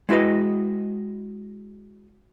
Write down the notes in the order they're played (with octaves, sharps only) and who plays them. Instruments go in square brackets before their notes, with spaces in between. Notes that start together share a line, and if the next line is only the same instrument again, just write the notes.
[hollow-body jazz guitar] G#3 E4 F#4 B4 D#5